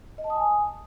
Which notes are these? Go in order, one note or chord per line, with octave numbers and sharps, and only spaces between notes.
D#5
A5
D#6
G#5